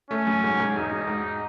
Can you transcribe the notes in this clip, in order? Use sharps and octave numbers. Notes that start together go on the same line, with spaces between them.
A3 C#4
F#2
G#2
G#2
E1 D#4
E1
G#2